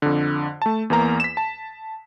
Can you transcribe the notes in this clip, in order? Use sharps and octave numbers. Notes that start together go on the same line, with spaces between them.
F2 D3
A3 A5
E2 E3 A#3 A#5
B6 E7
A5